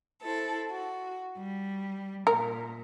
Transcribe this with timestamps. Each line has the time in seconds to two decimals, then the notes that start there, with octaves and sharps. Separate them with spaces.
0.21 E4 A4 C5
0.71 F#4
1.38 G3
2.27 A#2 A#4